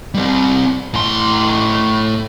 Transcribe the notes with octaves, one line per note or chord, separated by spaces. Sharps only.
G3 C4
A2 C6